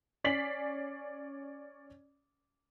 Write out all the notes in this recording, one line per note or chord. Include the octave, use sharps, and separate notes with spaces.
C#4 D5 B6 C7 F#7